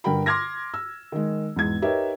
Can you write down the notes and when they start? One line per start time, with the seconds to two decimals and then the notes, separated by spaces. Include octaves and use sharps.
0.04 G2 D3 A#4 G5 B5
0.26 C6 D6 F6 G#6 A#6
0.74 E6
1.12 D#3 G#3
1.56 E2 G#2 G#3 G#6
1.82 D#4 G4 A#4 B4 C#5 E5